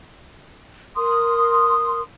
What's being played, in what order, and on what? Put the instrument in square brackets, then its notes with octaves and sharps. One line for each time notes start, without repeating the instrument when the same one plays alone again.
[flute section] A#4 C6 D#6